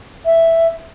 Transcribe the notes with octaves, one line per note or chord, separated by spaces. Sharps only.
E5